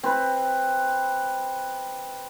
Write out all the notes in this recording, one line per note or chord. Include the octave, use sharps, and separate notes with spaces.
C4 B4